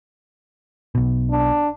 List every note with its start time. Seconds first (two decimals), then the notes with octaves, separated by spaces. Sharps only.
0.95 B1 B2
1.31 D4